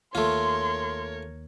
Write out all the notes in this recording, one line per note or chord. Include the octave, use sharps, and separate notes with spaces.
D#2 A3 F4 A#4 C#5 C6